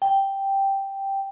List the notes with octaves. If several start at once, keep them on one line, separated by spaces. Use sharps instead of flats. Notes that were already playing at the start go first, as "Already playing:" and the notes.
G5